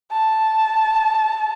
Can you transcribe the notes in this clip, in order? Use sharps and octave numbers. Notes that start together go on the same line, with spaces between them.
A5